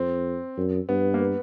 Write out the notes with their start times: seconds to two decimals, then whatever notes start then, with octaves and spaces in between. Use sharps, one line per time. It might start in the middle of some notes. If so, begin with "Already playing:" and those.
Already playing: F2 C4
0.57 F#2
0.89 G2 B3
1.14 A#3
1.20 B3